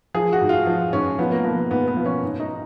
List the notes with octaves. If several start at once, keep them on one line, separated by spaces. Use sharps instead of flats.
F3 G#4
F#4
G#2
F4
F3
G#2 C#4
F3 B3
A#3
F3 B3
G#2 B3
B3
F3
C#4
G#2
D#4